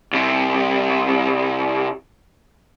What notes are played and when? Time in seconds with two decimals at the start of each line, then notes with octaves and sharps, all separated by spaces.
0.13 C2 C3